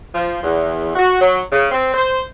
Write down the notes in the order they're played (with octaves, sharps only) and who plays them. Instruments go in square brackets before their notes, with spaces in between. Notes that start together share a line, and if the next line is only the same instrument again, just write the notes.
[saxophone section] F3
E2
F#4
F#3
C#3
C4
C5